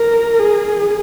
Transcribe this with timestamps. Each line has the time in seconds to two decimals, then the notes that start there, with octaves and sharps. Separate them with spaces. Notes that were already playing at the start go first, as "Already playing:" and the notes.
Already playing: A#4
0.38 G#4